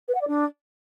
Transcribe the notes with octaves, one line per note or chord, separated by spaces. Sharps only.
B4
F#5
D5
D4